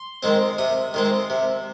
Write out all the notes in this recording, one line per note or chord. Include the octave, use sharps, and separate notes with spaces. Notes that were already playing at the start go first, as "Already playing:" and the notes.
Already playing: C6
D#3 G#3 C4
C3 D#6
D#3 G#3 C4
C3